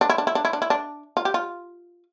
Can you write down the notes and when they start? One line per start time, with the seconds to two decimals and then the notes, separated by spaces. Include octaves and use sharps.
0.01 D4
0.10 E4
0.18 D4
0.27 E4
0.35 D4
0.45 E4
0.53 D4
0.62 E4
0.70 D4
1.17 F4
1.25 G4
1.34 F4